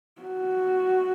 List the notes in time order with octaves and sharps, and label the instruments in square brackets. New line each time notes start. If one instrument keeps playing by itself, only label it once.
[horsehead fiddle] F#4